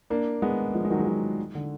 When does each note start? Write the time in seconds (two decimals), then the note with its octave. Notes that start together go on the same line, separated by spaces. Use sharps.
0.10 A#3 D4
0.42 G#3 B3
0.74 F3 G#3
0.85 G#3
0.90 D#3 F#3
0.99 G#3
1.06 D#3 F#3
1.55 D3